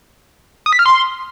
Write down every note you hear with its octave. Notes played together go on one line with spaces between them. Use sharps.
D#6
B6
F6
C6